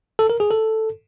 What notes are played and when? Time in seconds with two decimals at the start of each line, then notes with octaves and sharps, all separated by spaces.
0.19 A4
0.30 A#4
0.40 G#4
0.51 A4